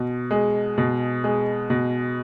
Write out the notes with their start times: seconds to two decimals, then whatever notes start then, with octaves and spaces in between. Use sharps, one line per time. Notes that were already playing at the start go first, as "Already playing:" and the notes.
Already playing: B2
0.31 G#3
0.78 B2
1.24 G#3
1.70 B2